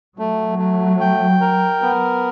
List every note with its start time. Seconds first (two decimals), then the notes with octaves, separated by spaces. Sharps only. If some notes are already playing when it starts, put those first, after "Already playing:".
0.18 F#3 A3
0.59 A3
1.00 G5
1.41 A#4
1.82 B3